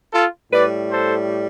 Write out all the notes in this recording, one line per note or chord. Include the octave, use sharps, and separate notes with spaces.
F4 A4
A2 G3 B4 D5
A4 C5